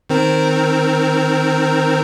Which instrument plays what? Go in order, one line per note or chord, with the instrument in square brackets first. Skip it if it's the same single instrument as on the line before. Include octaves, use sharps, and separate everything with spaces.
[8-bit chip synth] D#3 C4 A#4